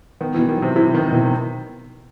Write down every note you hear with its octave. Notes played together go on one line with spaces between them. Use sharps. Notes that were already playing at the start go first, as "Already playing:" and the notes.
D#3 B3
B2 E3
D#3
C3 F#3
C3 E4
D#3 B3
D#3
B2 E3
D#3